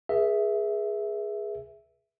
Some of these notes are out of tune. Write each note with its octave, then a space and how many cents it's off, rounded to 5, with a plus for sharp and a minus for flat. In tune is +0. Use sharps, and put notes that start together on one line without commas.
G#4 +0 B4 -40 E5 +0